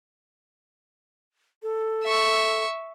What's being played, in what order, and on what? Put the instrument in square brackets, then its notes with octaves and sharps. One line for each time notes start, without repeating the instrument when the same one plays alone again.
[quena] A4
[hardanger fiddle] E5 C#6